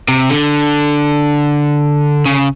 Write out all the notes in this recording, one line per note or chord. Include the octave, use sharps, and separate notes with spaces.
C3
D3
C#3